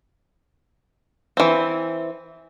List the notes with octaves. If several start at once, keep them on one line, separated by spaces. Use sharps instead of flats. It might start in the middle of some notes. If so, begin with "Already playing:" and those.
E3 C4